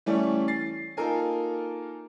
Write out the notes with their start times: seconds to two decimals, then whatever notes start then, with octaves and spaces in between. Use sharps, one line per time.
0.06 E3 G3 A3 C#4 E4 G4
0.48 A6 C7
0.97 A#3 D#4 F4 A4 A#4 G#5